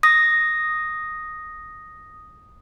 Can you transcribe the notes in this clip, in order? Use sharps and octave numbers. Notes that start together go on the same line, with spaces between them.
D#6 A#6